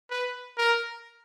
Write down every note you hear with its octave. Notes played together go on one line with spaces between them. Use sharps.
B4
A#4